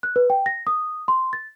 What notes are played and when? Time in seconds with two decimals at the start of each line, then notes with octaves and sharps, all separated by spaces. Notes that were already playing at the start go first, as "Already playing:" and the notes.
0.03 F#6
0.16 B4
0.30 G5
0.46 A#6
0.67 D#6
1.08 C6
1.33 A6